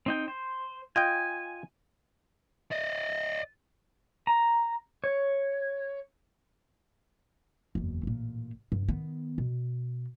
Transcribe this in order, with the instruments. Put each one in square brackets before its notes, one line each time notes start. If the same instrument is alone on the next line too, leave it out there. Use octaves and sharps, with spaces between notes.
[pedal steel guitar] C4 D#4 G5
C5
[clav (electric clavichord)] F4 D#5 G5 [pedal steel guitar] G#5
[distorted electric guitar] D5 D#5
[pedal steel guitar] A#5
C#5
[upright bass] F#1 E2
A1 A#2
G2
D#3 B3
B2